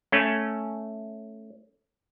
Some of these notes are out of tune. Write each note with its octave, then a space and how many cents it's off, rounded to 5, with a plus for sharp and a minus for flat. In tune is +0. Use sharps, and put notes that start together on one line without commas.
A3 +0 C#4 +0